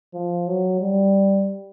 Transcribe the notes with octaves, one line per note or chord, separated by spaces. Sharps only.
F3
F#3
G3